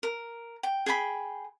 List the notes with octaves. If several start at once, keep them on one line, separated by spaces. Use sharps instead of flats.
A#4
G5
G#4 G5 G#5 B5